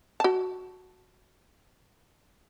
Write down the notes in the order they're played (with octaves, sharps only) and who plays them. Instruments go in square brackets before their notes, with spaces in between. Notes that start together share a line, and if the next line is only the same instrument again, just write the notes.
[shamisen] F#4 A5